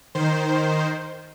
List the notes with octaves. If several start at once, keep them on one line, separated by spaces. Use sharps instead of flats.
D#3 C5